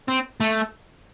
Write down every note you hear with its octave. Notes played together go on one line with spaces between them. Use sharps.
C4
A3